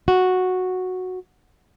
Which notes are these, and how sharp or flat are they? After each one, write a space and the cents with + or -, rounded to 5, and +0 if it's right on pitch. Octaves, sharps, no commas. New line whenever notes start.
F#4 -5